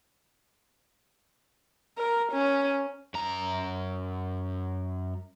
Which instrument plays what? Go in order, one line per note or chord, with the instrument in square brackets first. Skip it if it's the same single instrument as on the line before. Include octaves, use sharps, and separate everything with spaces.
[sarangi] A#4
C#4
[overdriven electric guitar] F#2 A#5